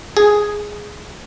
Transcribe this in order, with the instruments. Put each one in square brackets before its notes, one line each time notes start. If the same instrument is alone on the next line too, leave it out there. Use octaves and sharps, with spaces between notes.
[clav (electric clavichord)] G#4